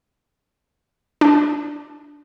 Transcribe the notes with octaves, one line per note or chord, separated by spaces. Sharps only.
D4